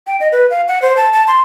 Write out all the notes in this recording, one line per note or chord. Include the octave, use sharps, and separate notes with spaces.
G5
D#5
B4
F5
F#5
C5
A5
A5
C6